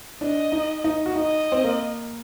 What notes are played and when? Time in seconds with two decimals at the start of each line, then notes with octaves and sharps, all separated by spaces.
0.21 D4 D#5
0.52 D#4
0.84 D#4
1.06 F#4
1.16 D#4 D#5
1.52 C4
1.64 A#3